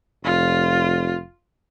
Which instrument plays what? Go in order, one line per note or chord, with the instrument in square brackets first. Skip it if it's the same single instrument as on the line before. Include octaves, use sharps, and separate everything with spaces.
[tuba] F1 [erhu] F4